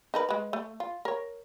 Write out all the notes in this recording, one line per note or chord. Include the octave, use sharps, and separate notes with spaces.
D#4 A#4 B4
G#3 B4
A3
F4
A#4 C#5